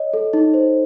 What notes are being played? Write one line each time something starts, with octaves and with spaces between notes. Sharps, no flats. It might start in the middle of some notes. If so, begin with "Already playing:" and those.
Already playing: C#5 D#5
A4
D#4
C5